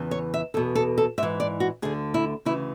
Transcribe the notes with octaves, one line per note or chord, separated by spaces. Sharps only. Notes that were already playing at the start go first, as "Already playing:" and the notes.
Already playing: E2 C#3 E3
C#5
E5
E2 B2 A4
A4
A4
G#2 E3 E5
D5
F#4
D2 D3 G#4
E4
D2 C#3 E3 E4